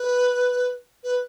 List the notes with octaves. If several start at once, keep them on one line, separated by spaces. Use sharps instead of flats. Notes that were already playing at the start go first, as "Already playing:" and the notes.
Already playing: B4
B4